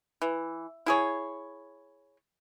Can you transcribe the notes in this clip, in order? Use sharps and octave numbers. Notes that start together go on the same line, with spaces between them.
E3
E4 G#4 C#5